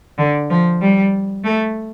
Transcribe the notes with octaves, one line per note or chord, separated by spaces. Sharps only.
D3
F3
G3
A3